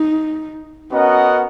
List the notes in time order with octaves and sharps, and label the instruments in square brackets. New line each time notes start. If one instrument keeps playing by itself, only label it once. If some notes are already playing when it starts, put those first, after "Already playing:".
Already playing: [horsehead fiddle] D#4
[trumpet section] B3 F#4 A#4 D#5 F#5 [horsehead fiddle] C#4